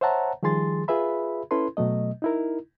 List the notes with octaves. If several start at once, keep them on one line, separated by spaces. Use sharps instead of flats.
C5 C#5 E5 F#5 A5 A#5
D#3 F3 G3 G#4 C6 A6
F4 G#4 B4 E5 B5
C#4 E4 A4 B4 C6
B2 F#3 A3 D#5
D#4 E4 A#4